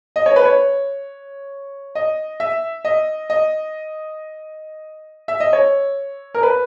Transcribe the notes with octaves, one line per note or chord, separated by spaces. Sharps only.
D#5
C#5
B4
C#5
D#5
E5
D#5
D#5
E5
D#5
C#5
A#4
B4